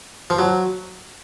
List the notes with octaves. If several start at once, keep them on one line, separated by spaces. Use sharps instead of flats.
F3
F#3